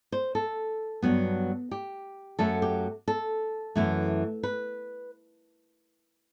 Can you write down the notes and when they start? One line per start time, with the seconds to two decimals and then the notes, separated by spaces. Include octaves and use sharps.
0.12 C5
0.35 A4
1.02 G2 F#3 B3
1.71 G4
2.39 F#2 F#3 A3 A4
2.62 G4
3.08 A4
3.76 F#2 E3 A3
4.43 B4